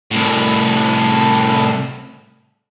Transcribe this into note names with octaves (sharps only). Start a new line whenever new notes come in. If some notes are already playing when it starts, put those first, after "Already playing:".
C2 A2